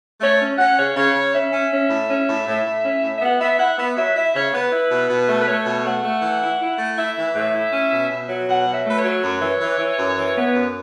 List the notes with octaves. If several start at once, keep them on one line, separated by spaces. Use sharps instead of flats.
A3 C#5
C#4
C#4 F#5
C#3 C#5
C#3 C#5
C#3
C#4 E5
C#4
C#4
A2
C#4
A2
A2
A2
C#4
A2
E5
B3 F#5
B3 E5
E4 F#5
B3 E5
F#3 E5
E4 E5
C#3 C#5
B3 B4
E4
B2
B2
A3
B4
A3 C#5
B2
A3 F#5
A3
E3
E4
E4
A3
E4 E5
E3
A2
E4
C#4
B2
B2
F#3
B2 F#5
F#3
E5
A3 B4
C#5
F#3
F#2
E3
E3
E3
F#2
E3
B3
F#2